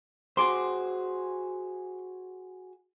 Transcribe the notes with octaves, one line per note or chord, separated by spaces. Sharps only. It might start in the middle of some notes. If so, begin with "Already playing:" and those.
F#4 G#4 C5 C6 D6